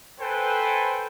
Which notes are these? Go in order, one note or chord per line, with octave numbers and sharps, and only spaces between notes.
A4 B4 C5 G5 G#5